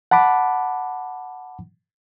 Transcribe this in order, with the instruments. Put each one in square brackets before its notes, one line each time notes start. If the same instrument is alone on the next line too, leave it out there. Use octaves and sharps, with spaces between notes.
[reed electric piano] F#5 A5 B5 D6